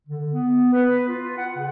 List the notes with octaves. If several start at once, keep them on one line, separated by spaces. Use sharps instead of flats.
D3
B3
B4
F4
F#5
C#3